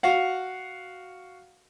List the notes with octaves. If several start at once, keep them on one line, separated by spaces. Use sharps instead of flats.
F#4 F5 F#5